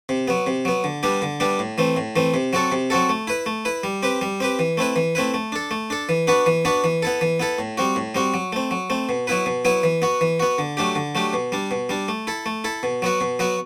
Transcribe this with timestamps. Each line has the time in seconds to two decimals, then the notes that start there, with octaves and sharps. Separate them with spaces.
0.09 C3
0.28 F#3 B3
0.47 C3
0.65 F#3 B3
0.84 D3
1.03 G3 B3 D4 G4
1.22 D3
1.40 G3 B3 D4 G4
1.59 A2
1.78 E3 A3 C4
1.96 A2
2.16 E3 A3 C4
2.34 C3
2.53 F#3 C4 F#4 A4
2.72 C3
2.90 F#3 C4 F#4 A4
3.09 A3
3.28 E4 B4
3.46 A3
3.65 E4 B4
3.84 G3
4.03 C4 G4 B4
4.21 G3
4.40 C4 G4 B4
4.59 E3
4.77 A3 C4 E4 B4
4.96 E3
5.15 A3 C4 E4 B4
5.34 A3
5.52 D4 A4
5.71 A3
5.90 D4 A4
6.09 E3
6.27 B3 D4 F#4 B4
6.46 E3
6.65 B3 D4 F#4 B4
6.84 E3
7.03 B3 E4 A4
7.21 E3
7.40 B3 E4 A4
7.59 A2
7.78 G3 C4 F#4
7.96 A2
8.15 G3 C4 F#4
8.34 F#3
8.53 A3 C4
8.71 F#3
8.90 A3 C4
9.09 B2
9.27 F#3 B3 E4 B4
9.46 B2
9.65 F#3 B3 E4 B4
9.83 E3
10.02 B3 F#4
10.21 E3
10.40 B3 F#4
10.58 D3
10.77 F#3 A3 D4 G4
10.95 D3
11.15 F#3 A3 D4 G4
11.33 B2
11.52 G3 D4
11.71 B2
11.89 G3 D4
12.08 A3
12.27 E4 A4
12.46 A3
12.64 E4 A4
12.83 B2
13.02 F#3 B3 F#4
13.21 B2
13.39 F#3 B3 F#4